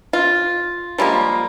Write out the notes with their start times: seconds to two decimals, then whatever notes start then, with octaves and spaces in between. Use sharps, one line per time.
0.13 F4
0.98 F3 G3 G#3 A#3